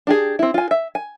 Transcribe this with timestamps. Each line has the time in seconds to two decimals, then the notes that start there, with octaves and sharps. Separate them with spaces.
0.07 D4 G4 G#4
0.39 C4 E4
0.54 F4 G#5
0.71 E5
0.95 G#5